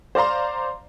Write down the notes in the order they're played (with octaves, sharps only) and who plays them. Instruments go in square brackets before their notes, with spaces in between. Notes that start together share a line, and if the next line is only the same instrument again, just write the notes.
[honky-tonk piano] C5 D5 F5 A#5 C6